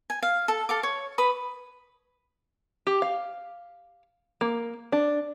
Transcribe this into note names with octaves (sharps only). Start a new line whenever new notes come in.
G#5
F5
A4
A4 F5 D6
C#5
B4 B5 D#6
G4
F5
A#3
D4